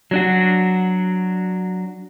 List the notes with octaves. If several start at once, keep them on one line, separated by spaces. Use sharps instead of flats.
F#3 D4 F#4